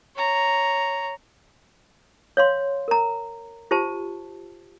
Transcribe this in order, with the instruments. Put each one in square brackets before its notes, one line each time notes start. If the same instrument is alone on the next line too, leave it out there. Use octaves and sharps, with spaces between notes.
[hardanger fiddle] C#5 A#5
[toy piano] C#5 F5 C6
A#4 A#5
F4 G4 C5 A5